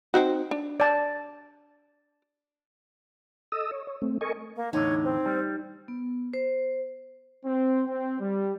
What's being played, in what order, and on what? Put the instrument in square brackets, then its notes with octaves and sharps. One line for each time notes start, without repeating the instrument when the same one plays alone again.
[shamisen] C4 D#4 F#4
D4
[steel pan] D5 A5
[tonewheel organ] A4 D#5 D#6 E6
C#5
C#5
A3 C4
A4 A#4 D#5 G#5 C#6
[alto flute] A#3
[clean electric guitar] E2 A2 D3 [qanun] D#4 [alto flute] C#5
[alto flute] C4
[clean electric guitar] G3
[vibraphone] B3
C5
[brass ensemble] C4
C4
G3